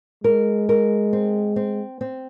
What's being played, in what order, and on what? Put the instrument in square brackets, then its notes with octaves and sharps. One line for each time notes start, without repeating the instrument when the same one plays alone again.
[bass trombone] G#3 [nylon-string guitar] A#4
[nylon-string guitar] A#4
C4
C4
C4